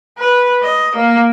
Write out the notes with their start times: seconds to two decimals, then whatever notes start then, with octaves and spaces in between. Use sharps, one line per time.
0.18 B4
0.63 D#5
0.95 A#3